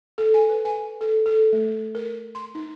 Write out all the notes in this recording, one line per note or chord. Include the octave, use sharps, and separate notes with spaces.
A4
G#5
B4
G#5
A4
A4
A3
A#4
C6
D#4